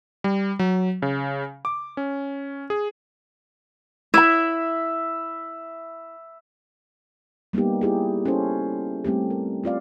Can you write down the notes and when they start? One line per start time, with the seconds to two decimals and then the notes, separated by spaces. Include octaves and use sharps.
0.24 G3
0.59 F#3
1.02 C#3
1.65 D6
1.97 C#4
2.70 G#4
4.14 E4 E5 B5
7.53 G3 A#3 B3 D#4 G4
7.81 E4 G4 G#4
8.26 C#4 E4 A4 C5
9.05 G3 A3 C4 G4
9.30 A#4
9.64 C4 F4 D5 F5